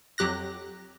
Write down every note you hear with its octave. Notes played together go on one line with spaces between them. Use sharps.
F2 F#3 G4 F#6 A#6